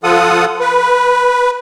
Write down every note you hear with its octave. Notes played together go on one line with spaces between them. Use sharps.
F3 F4 A4 F#5 D#6
B4